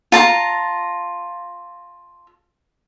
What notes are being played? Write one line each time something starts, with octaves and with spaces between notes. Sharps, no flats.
F4 A5 A#5